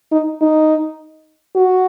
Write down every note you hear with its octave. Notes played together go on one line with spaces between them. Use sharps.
D#4
D#4
F#4